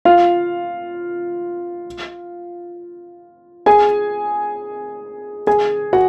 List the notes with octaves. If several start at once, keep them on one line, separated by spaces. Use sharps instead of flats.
F4 F5
G#4 G#5
G#4 G#5
F#4 F#5